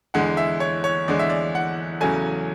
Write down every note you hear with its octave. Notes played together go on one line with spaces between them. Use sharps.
E2 D3 G#3 F#5
E5
C#5
C#5
E2 D3 G#3 D5
E5
D5
F#5
E2 C#3 F#3 A3 G#5